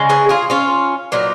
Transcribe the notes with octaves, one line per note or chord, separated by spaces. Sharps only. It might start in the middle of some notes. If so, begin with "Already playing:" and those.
Already playing: C#3 G#3
G#4 B4
F4 G#4
C#4 F4
A#2 F#3 B3 D#4